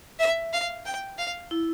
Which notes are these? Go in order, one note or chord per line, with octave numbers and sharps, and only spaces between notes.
E5
F5
G5
F5
E4